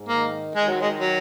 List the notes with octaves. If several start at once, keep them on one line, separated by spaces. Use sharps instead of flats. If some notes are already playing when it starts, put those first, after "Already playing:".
Already playing: G#2
D#3 A#3
D#3 G#3
F#3
G#3
F#3